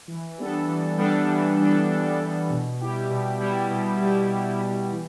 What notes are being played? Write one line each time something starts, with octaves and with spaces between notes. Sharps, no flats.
E3
G3 B3 D4 A4
E3
G3 B3 D4 A4
E3
G3 B3 D4 A4
E3
G3 B3 D4 A4
B2
G3 E4 G4
B2
G3 E4 G4
B2
G3 E4 G4
B2
G3 E4 G4
E3